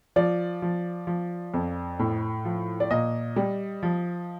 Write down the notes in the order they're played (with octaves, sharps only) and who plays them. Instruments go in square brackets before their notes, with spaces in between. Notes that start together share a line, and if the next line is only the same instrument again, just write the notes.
[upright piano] F3 D5
F3
F3
F2
A2
F3
D5
A#2 D#5
G3
F3